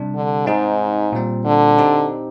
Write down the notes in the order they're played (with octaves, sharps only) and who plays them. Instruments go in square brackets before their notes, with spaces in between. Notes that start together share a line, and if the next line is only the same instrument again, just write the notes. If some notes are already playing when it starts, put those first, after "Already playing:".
Already playing: [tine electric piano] C3 G3 D4
[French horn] D3
[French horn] G#2 [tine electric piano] C4 D#4 G#4
[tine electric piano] A#2 G3 C4
[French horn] D3
[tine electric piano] C4 D#4 G4